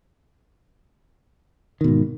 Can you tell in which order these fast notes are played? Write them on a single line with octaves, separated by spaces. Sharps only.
D#3 B2 G#2